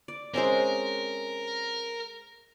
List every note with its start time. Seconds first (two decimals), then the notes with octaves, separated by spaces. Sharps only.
0.08 D5
0.34 G#3 C4 C#4 A#4